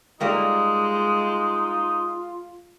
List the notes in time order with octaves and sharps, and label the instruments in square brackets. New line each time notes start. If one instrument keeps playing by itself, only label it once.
[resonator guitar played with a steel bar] G3 A#3 D5 [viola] G#3 [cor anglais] D#4 [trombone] F4